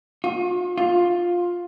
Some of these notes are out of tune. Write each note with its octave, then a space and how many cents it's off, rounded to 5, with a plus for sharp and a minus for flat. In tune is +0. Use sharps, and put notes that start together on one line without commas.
F4 +40
F4 +10